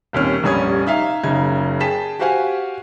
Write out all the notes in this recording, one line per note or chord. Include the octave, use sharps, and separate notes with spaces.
D#1 D#2 C3 C#4 F6
F1 A#1 G3 C#4 D#6 G#6
D#4 E5 F5
F#1 C#3 D#4 G#6
G#4 G5 A5 B6 E7
F#4 G4 C5 F5 F#5 G#5